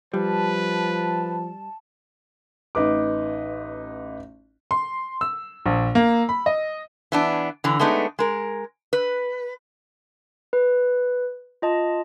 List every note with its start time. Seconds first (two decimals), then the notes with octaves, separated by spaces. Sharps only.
0.14 F3 G3 B4 A5
2.75 A1 D#4 B4 D6
4.71 C6
5.21 E6
5.66 A#1
5.95 A#3
6.29 B5
6.46 D#5
7.12 E3 B3 D4
7.64 D3 E3
7.79 G#3 A3 B3 D4 D#4
8.19 G#3 A#4
8.93 B4
10.53 B4
11.62 F4 D#5 A5